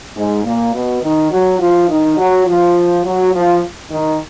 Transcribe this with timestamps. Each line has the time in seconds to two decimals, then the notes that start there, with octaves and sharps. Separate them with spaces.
0.15 G#2 G#3
0.44 A#2 A#3
0.73 B2 B3
1.02 D#3 D#4
1.31 F#3 F#4
1.59 F3 F4
1.88 D#3 D#4
2.17 F#3 F#4
2.46 F3 F4
3.03 F#3 F#4
3.32 F3 F4
3.90 D#3 D#4